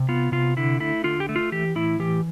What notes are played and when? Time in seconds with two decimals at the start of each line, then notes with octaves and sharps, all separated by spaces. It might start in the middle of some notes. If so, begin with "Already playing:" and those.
Already playing: C3
0.09 B3 F4
0.32 C3 F4
0.57 D3 E4
0.80 A3 E4
1.04 D3 F4
1.20 G4
1.29 A3
1.36 F4
1.52 E3 G4
1.76 A2 E4
1.99 E3 G4